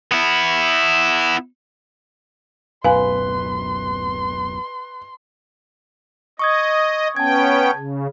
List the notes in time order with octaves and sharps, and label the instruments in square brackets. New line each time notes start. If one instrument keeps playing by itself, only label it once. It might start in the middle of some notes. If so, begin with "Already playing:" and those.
[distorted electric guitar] B3 E4
[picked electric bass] D1 F#2 B2 [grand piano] B4 [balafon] F5 G#5 [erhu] C6
[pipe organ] D#5 [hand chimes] C#6 D#6 G#6
[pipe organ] B3 C#4 G5 [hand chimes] A5 G#6
[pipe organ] C#3